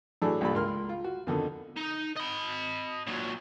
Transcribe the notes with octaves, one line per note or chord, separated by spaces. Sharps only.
A2 E3 F#3 A3 D4 G#4
B1 G2 A#2 G3 D5 B5
C#2 A#4 C6 F6
F4
F#4
F2 B2 D3 D#3
D#4
D#5 B5
A#2 F#3